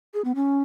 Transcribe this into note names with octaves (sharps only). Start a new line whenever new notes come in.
G#4
B3
C#4